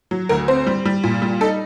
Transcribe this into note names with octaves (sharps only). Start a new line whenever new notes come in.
F#3
D2 A#4
C4 C5
G3
G3
A#2
G3
D#4 A4